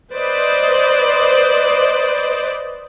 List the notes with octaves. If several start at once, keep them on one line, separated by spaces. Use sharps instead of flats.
B4 C5 D5 D#5